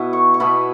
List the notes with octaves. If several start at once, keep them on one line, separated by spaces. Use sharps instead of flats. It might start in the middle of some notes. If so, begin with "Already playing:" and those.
Already playing: B2 B3 E4 F#4
C#6
C#6
B2 B3 E4 B5